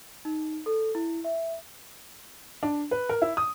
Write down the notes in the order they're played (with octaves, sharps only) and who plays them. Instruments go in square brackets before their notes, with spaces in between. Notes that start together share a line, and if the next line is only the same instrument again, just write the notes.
[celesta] D#4
A4
E4
E5
[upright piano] D4
B4
A#4
E4
D#6